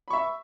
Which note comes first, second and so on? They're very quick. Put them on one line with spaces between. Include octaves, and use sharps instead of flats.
B5 C#6 E5